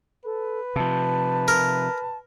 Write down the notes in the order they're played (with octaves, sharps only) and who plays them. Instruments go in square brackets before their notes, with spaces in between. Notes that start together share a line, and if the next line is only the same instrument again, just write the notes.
[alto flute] A4 [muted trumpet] B4
[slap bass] C3 F3 [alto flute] A5
[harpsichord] A#4